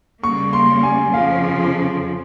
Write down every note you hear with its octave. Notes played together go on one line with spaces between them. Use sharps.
C#3 G3 A#3 C#6
C6
G#5
F2 C#3 F3 F5